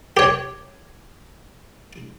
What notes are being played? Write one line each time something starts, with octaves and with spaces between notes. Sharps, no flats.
G4 C#5